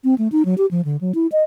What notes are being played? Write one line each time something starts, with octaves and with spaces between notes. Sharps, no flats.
C4
A3
D#4
F#3
G4
F3
D3
F#3
E4
D#5